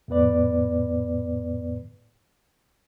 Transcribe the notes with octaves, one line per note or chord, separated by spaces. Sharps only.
F2 A2 B3 B4 D5